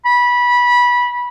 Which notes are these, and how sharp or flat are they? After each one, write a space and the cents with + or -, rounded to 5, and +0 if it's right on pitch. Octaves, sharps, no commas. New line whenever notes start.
B5 -20